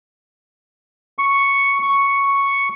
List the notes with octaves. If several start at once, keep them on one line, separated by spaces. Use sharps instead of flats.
C#6
C#6